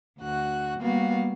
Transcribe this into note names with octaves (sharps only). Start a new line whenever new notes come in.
D2 F#4 F#6
G3 A#3 B3 F#4 F5